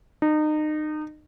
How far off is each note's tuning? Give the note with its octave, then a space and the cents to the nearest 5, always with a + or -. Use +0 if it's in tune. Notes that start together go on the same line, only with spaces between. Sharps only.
D#4 -30